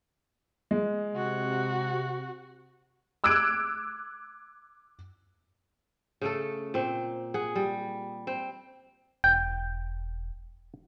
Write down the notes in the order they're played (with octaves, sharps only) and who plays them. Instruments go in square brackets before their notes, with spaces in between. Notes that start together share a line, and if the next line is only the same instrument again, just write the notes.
[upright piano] G#3
[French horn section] C3 [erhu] F#4
[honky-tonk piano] D6 E6 F#6 G#6 D7
[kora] C#3 A3 A4
A#2 C4
G#4 F#5
G3
C4
[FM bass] E1 [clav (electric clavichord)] G5